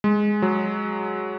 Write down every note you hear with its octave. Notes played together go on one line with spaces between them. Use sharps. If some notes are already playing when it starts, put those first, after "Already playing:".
G#3
F#3